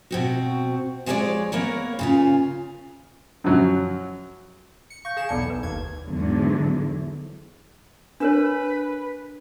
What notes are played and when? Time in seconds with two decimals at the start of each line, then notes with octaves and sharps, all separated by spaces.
0.11 B2 C4 F#4
1.06 F3 G#3 G#4 A#4 C#5 D5
1.52 A#3 B3 A#4 C#5
1.99 A#2 C#3 F4
3.44 F#2 F3 F#3
4.90 C#7
5.05 F5 C#6 G6
5.17 G#4 F5 G#5 E7
5.29 B1 E2 A4 D5 A5 C#7
5.50 B1 B4
5.63 G1 D#2 G#6
6.05 E2 G#2 D3 F#3
8.20 D4 A#4 B4 C#5